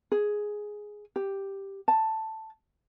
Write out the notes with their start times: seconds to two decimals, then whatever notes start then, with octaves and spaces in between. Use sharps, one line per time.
0.12 G#4
1.16 G4
1.88 A5